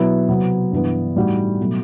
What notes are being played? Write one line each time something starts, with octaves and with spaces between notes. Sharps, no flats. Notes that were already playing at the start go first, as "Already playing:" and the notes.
Already playing: B2 F#3 B3 E4
C3 F#3 B3
G2 E3 B3
A2 G3 D#4 F#4
B2 F#3 A3